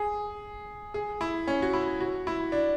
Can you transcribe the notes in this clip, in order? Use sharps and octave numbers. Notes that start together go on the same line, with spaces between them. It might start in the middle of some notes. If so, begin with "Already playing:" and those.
Already playing: G#4
G#4
E4
C#4
F#4
E4
F#4
E4
D4